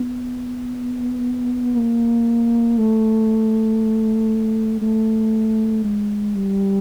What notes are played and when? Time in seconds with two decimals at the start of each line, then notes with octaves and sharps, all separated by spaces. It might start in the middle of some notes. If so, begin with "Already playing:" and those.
Already playing: B3
1.76 A#3
2.78 A3
4.82 A3
5.85 G#3
6.35 G3